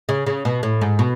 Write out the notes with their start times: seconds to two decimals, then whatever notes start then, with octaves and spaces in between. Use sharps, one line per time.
0.09 C#3
0.27 C#3
0.45 B2
0.63 A2
0.81 G#2
0.99 B2